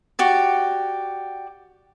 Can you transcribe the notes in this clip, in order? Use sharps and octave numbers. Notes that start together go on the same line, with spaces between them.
F#4 G4 D5